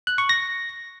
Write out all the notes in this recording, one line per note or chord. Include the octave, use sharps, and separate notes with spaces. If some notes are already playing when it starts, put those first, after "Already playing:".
F#6
C#6
A#6